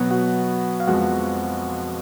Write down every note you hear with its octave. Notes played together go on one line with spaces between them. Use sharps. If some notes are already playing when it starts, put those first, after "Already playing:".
Already playing: B2 F#3 B3 F#4 F#5
F#4 F#5
F5
F2 F3 G#3 B3 F#4 F#5